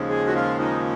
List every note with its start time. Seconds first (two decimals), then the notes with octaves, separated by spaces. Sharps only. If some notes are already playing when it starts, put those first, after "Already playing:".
Already playing: D#2 C#3 F3 G#3
0.10 G#4
0.27 F#4
0.35 F4
0.60 D#4